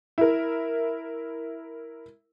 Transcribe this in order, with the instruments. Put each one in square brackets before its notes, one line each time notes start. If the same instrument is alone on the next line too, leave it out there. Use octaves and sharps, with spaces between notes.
[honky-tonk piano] E4 A#4